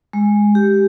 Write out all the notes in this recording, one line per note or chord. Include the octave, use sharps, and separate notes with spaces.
G#3
G4